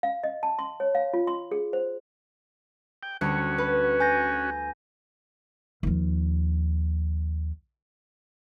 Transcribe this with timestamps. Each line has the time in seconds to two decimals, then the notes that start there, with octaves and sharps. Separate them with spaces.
0.03 F5
0.24 D#5
0.43 A5
0.59 C6
0.80 C#5
0.95 F5
1.14 F4
1.27 C6
1.51 G#4
1.73 C5
3.03 G5
3.21 D2 G3 C#4 F#4 C#7
3.58 B4
4.00 G#5 G6 A#6
5.83 D#2 F3